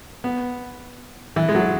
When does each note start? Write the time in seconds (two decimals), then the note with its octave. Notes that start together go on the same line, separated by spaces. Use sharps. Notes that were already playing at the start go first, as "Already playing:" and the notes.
0.24 B3
1.36 E3
1.49 G#3
1.55 F#3